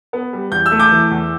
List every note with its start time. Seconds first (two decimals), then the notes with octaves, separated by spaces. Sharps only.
0.13 B3
0.33 G3
0.51 E2 G6
0.66 E6
0.71 A3
0.80 D6 G6
0.91 E3
1.11 E2